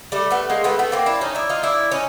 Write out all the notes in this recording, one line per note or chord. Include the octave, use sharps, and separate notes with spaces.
G3 A3
A3 B3
G#3 A#3
A3 B3
A3 B3
A#3 C4
D4 E4
C#4 D#4
D4 E4
D#4 F4
D4 E4
C#4 D#4